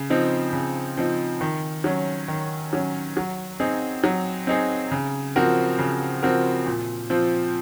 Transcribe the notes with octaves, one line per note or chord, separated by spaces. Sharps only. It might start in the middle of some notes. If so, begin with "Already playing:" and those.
Already playing: C#3
F3 C4 D#4
C#3
F3 C4 D#4
D#3
F#3 C#4
D#3
F#3 C#4
F#3
C4 D#4 G#4
F#3
C4 D#4 G#4
C#3
F3 C4 F#4 A#4
C#3
F3 C4 F#4 A#4
A#2
F3 C4 F4